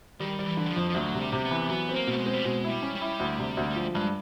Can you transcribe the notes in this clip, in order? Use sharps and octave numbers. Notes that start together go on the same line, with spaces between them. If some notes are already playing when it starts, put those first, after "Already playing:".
D#3 G3
G3
E3
D3
F#3
F3
F2
F3
D2 F#3
C3
G3
C3
B3
E3
F#3 B3
C4
A#3
B2 A3
G#3
C4
G3
B2 G#3
E4
G3
C#4
G3
E4
D2
C3
D2
F3
G2 G#3